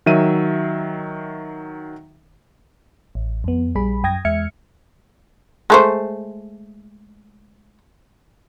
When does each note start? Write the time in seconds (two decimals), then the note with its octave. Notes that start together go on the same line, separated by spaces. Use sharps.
0.06 D#3 F#3 E5 D#7
3.15 A1
3.44 F2 B3
3.75 A#1 G3 G#4 B5
4.03 F#2 G5 D#6 G#6 A#6
4.25 E2 G#3 E5 F6 G#6 C#7
5.70 G#3 A3 C5